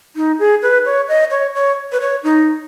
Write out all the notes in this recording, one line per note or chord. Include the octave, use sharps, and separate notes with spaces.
D#4
G#4
B4
C#5
D#5
C#5
C#5
B4
C#5
D#4